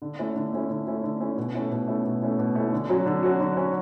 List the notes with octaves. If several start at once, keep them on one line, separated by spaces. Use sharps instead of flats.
D3
A3 C#4 E4
D3
A3 C#4 E4
D3
A3 C#4 E4
D3
A3 C#4 E4
B2
A3 C#4 E4
B2
A3 C#4 E4
B2
A3 C#4 E4
B2
A3 C#4 E4
D3
F#3 C#4 F#4
D3
F#3 C#4 F#4
D3
F#3 C#4 F#4